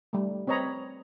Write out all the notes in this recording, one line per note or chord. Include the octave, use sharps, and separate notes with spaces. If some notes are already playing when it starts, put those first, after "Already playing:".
G3 A3
C4 B4 C#5 D#5 A#5 B5